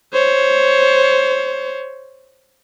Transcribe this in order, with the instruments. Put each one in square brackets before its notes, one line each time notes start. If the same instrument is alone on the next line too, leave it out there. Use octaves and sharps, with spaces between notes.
[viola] C5 C#5